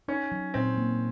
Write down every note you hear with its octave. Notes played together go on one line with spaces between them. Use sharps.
C#4 D#4
F#3
A#2 C4
A#3